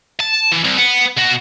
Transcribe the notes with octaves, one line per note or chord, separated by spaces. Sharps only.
A5
E3
C2
B3
B2 F#4